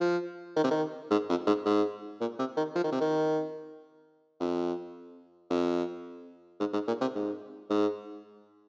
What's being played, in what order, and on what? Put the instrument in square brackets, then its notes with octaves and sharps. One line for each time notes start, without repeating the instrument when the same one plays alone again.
[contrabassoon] F3
D#3
C3
D#3
G#2
F2
G#2
G#2
A#2
C3
D#3
F3
D#3
C3
D#3
F2
F2
G#2
G#2
A#2
C3
G#2
G#2